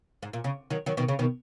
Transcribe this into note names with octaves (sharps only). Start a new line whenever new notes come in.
G#2
A#2
C#3
D#3 F#3
D#3 F#3
B2 D#3
C#3
B2 D#3